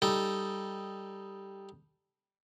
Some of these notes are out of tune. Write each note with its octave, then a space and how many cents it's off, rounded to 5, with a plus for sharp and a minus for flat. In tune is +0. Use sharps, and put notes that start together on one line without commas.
G3 +0 D#4 +0 A4 +0